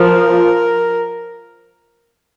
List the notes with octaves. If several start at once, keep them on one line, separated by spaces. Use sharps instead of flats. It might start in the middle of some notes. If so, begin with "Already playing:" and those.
Already playing: F3 A#4